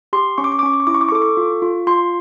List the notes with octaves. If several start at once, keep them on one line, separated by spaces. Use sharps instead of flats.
G4 C6
C#4 C#6
D6
C#6
D6
C#4 C#6
D6
C#6
E4 D6
C#6
D6
C#6
A4 D6
C#6
F4
F4
F4 C6